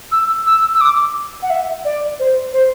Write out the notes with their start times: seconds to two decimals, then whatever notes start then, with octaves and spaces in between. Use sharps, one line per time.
0.12 E6
0.47 E6
0.75 E6
0.81 D6
1.42 F#5
1.50 E5
1.85 D5
2.19 C5
2.53 C5